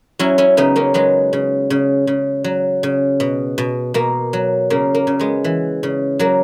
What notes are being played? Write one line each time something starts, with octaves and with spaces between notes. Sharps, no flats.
F#3 C#4 E4
C#4 E4
C#3 B3 D#4
A#3 C#4
F#3 G#3 B3
C#3
C#3
C#3
F#3
C#3
B2
B2
B2 A#3
F#3
C#3 A#3
A#3
C#3
G#3 B3
E3
C#3
F#3 A#3